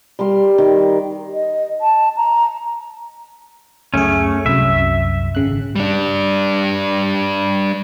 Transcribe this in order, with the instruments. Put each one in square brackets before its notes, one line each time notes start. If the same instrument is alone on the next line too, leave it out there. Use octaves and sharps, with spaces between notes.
[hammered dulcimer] G3 A#4 C6
D#3
[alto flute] D#5
A5
A#5
[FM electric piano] C#2 F#2 G#4 [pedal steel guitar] A3 C#4
[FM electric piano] C2 F#2 [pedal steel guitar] E5
[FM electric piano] G#1 C#3 F#6
[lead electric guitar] G3 D4